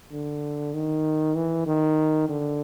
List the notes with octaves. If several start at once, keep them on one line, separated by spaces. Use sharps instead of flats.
D3
D#3
E3
D#3
D3